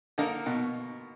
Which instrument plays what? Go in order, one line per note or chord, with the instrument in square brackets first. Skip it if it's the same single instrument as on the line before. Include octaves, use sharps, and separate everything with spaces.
[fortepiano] D3 [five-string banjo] A#3 D#4 A#4
[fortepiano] B2